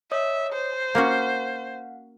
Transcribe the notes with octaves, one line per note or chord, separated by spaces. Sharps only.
C#5 D#5 E5 D#6
C5
A#3 C#4 F#4 F5 F#5